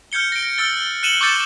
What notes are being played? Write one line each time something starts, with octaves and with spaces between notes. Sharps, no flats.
F6 G6 G#6 C#7 G7
A#6 D7
E6 F6 A6 G7
F#6
F#6 C#7 D#7 E7 F#7 G7
C#6 D6 E6 G6 A6 C#7